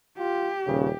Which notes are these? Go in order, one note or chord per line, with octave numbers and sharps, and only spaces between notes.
F4 G4
D#1 C#3